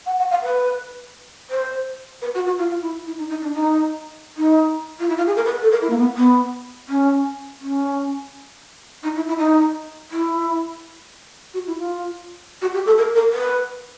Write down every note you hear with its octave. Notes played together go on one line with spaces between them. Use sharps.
F#5
F#5
F5
B4
C5
B4
F#4
F#4
F4
F4
E4
E4
D#4
D#4
D4
D#4
D#4
F4
E4
F4
G#4
A#4
B4
A4
A#4
E4
A#3
B3
B3
C#4
C#4
D#4
E4
E4
D#4
E4
F#4
E4
F4
F#4
G4
A4
A#4
A#4
B4